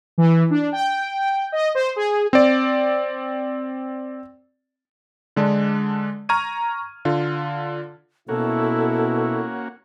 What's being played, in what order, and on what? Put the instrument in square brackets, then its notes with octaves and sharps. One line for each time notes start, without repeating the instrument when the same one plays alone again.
[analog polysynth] E3
D4
G5
D#5
C5
G#4
[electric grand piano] C4 D5
D3 G#3 D4
A#5 C#6 F6 G#6 D#7
D3 F4
[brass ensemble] B2 E4 [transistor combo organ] A#3 C#4 F#4 [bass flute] A4